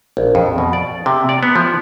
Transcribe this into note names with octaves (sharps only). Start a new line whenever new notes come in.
A#1
F2
B2
D5
C3
D5
B3
F3